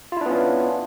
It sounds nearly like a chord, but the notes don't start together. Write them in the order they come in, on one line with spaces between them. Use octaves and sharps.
F4 E4 D4 B3 C#4